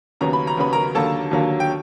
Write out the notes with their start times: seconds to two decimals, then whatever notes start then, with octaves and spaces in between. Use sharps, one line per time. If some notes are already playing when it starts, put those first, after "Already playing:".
0.21 D#2 C#3 F#3 B3 A#5
0.33 B5
0.47 A#5
0.57 D#2 C#3 F#3 B3 B5
0.73 A#4 A#5
0.95 D#2 D3 F#3 A#3 A4 A5
1.31 D#2 D3 F#3 A#3
1.60 G5